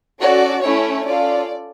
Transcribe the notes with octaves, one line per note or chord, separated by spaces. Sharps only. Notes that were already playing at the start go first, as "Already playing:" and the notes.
C#4 F#4 A4 D5
A3 C#4 E4 C#5
C#4 F4 A4 D5